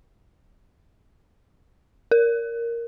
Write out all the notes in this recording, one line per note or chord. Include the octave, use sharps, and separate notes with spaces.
A#4